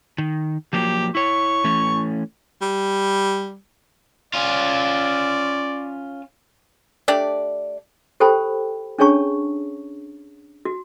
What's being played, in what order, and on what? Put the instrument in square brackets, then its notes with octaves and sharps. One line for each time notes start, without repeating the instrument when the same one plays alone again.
[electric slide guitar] D#3
[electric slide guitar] F3 F#3 A#3 [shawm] G4
[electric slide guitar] E4 C#5 [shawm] C#6
[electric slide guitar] E3 A3 C#4
[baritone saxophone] G3
[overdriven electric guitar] C#4 F4 [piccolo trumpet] D5
[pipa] A3 D4 G4 D5
[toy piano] G4 A4 C5 G5 A5 B5
C#4 D4 G#4 C#5 A5 C#6
F#4